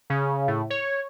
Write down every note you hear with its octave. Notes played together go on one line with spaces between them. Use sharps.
C#3
A2
C#5